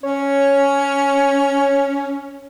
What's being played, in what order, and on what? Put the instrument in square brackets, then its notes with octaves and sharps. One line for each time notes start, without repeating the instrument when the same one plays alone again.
[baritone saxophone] C#4 [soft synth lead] C#5